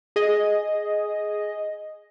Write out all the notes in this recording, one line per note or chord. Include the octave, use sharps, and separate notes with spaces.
G#4 D#5